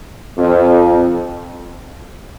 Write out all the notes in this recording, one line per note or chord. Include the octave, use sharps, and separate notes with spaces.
F2